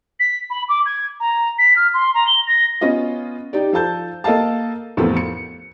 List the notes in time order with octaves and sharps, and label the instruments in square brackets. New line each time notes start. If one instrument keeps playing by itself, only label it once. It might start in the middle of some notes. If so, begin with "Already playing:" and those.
[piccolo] B6
B5
D6
G#6
A#5
B6
F6
C6
A#5
G7
A#6
[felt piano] B3 C#4 F4 D#5
D#4 G4 D5
F3 A4 A5 G6
A#3 A4 D#5 F5 A5
A1 F2 B3 F4 A4 A#4
C#7